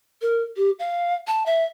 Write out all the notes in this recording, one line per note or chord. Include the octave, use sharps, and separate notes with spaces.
A#4
G4
F5
A5
E5